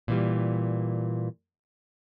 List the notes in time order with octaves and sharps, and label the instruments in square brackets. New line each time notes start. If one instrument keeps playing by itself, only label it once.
[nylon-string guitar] A#2 E3 G3